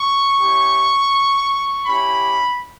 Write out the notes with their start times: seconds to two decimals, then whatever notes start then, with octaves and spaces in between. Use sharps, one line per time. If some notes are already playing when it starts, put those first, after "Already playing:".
Already playing: C#6
0.39 C#4 E4 G4
1.85 C#4 E4 G4 B5